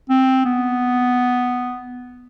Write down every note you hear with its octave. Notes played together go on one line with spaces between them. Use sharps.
C4
B3